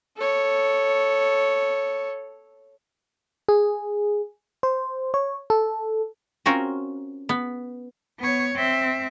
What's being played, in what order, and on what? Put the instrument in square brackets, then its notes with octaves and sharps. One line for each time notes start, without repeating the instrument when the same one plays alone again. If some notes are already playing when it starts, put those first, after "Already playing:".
[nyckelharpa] A4 C#5
[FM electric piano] G#4
C5
C#5
A4
[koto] C4 C#4 F4 F#4 A#4
B3
[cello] B3 C#5
C4 E5